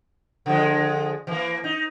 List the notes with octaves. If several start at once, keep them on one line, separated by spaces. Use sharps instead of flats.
D3 F3 G#3
E3 A#3
D#4